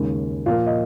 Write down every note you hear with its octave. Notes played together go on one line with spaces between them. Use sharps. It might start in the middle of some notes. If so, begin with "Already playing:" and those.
Already playing: D#2 C#3 G#3
A#2 F3 A#3 F5
D#5